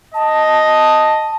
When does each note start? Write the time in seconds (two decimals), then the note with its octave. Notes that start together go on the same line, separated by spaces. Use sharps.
0.14 D#5 A5